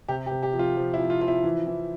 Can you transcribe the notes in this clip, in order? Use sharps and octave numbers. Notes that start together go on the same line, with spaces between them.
C3 G4
G4
C3
G4
F3
F4
F3
E4
F3
F4
F3 F4
E4
E3
E3